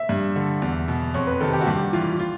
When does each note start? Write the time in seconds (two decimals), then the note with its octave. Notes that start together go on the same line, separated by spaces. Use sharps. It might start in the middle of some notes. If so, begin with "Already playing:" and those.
Already playing: E5
0.09 G2
0.36 D3
0.62 E2
0.88 B2
1.14 F2 C#5
1.27 B4
1.40 C3 D#3 A4
1.53 G4
1.61 F#4
1.67 G2 G4
1.93 E3 F4
2.19 F4